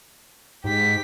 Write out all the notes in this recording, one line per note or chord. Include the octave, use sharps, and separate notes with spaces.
G#2 G4 B6